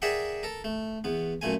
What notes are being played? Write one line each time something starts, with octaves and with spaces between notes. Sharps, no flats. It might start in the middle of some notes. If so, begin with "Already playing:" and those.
G#4 A#4 D5 E5 F#5 G5
A4 A#4
A3
E2 B3
F#2 A#2 A3 G#5